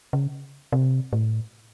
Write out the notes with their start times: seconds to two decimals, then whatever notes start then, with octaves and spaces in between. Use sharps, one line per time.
0.13 C#3
0.73 C3
1.13 A2